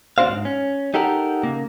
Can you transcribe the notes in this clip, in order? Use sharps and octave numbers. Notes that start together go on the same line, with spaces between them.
D2 C4 D4 F#4 C5 F5
G#2
C#4
D#4 G4 A4 A#4 F#5
C#3 A#3